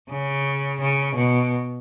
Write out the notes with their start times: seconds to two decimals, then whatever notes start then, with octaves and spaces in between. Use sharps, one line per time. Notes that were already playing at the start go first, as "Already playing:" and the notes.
0.10 C#3
0.81 C#3
1.16 B2